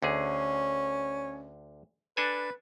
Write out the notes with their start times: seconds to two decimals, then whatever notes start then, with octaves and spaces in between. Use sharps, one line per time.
0.02 D2 D3 C#4 G#4
2.17 D4 A4 B4 G#5